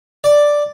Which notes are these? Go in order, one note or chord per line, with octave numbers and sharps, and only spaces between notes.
D5